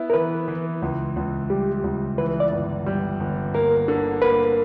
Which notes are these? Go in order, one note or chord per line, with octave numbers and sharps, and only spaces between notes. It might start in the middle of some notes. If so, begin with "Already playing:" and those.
Already playing: B3 E4
A#4
E3 B4
E3
C#2
C#2
G3 G4
C#2
E3 B4
D5
G1
G3
G1
A#3 A#4
D3
A#3 B4